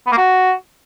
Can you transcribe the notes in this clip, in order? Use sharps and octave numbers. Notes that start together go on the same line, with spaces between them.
B3
A#3
F#4